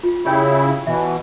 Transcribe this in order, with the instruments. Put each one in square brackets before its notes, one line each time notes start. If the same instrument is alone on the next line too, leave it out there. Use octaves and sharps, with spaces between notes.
[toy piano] F4
[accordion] C#3 E4 [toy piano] G4 C#5 G5
[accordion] B2 E3 [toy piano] E5